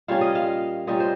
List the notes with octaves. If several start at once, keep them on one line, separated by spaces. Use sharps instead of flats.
A#2 G3 C#4 F5
D#5
F5
A#2 G3 C#4 D#5
C5